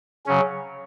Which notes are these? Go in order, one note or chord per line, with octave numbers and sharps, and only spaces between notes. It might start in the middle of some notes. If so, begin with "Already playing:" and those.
C#3 F#3 C#4